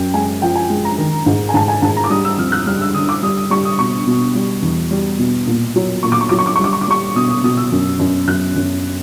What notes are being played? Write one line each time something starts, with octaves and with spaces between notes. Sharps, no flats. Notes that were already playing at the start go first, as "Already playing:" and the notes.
Already playing: F#2 G5
G#3 G#5
F3 G5
G#5
G#3
A#5
D#3
G#2
G#5
G#2 A5
G#5
G#2 A5
A#5
D6
G3 D#6
E6
F2 F6
F#6
G3 F6
E6
D3 D#6
D6
G3 D#6
D#6
G3 C#6
D#6
B2 C#6
B2
G3
E2
G3
B2
A#2
F#3
A#2 C#6
D6
C#6
F#3 D6
C#6
D6
G3 C#6
D6
C#6
D6
G3 C#6
B2 D#6
D#6
B2 D#6
E6
F#2
F#2
F#2 F#6
F#2